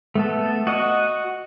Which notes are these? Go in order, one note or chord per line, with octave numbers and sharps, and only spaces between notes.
A3 B3 A4
F#4 D#5 F#5